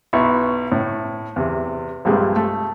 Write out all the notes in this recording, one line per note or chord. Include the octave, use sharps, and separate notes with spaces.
B1 E4 E5 B5 C#6
A2
E2 C3
A#1 G2 C3 G3 G#3
A3